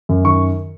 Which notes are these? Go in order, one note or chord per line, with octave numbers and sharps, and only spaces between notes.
F#2
D#3 C#6